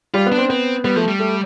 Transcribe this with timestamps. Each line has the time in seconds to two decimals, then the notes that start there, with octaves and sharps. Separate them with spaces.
0.14 G3 F4
0.26 B3
0.32 D4
0.38 C4
0.49 B3 C4
0.84 G3 B3
0.96 F3 A3
1.08 G3
1.19 A3